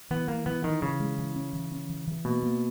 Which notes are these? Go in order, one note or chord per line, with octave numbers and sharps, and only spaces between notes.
E3 B3
E3 A#3
E3 B3
D#3 E3
C#3 E3
G#3
E3
C#4
E3
C#4
E3
E3
B2 A#3
A#3